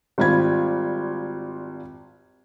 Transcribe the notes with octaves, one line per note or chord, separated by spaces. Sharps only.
G#1 G3 F4 B5 G#6